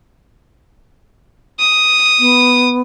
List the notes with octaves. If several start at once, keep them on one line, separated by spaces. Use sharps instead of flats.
D#6
B3